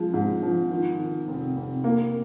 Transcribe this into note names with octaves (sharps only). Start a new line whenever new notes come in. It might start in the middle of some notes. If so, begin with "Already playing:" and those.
Already playing: F3 G#3
G#2
F3
D#3
D#3
F1
F1
A#3